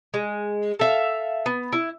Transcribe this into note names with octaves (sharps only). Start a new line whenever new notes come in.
G#3
A4 E5 F5
B3
E4